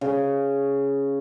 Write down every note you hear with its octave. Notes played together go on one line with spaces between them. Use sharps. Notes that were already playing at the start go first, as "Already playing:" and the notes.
C#3